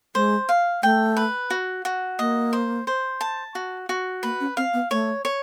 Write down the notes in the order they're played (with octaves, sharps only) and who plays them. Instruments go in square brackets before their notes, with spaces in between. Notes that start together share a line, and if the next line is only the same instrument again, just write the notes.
[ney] G#3 [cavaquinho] C5
[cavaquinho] F5
[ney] A3 [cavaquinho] G5
[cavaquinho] B4
F#4
F#4
[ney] A#3 [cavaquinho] D#5
[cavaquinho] C5
C5
A5
F#4
F#4
[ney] A#3 [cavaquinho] B4
[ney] C#4
[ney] C4 [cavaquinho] F5
[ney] B3
[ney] A3 [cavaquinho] C#5
[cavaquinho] C#5